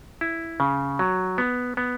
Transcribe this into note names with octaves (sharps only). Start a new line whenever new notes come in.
E4
C#3
F#3
B3
B3